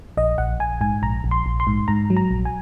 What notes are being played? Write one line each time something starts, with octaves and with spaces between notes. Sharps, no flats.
A#1 D#5
A#1 F#5
A#1 G#5
G#2 G#5
A#1 A#5
A#1
C6
A#1
C6
G#2
G#2 A#5
F#3
A#5
A#1
G#5